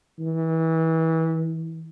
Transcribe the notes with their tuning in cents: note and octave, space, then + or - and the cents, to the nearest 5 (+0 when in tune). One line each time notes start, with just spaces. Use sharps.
E3 -25